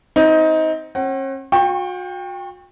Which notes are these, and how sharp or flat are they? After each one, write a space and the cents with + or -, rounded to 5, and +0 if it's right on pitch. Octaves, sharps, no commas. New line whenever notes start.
C4 +0 D#4 +25
C#4 -45 F#5 +40
F#4 -40 G5 +20 C#6 -15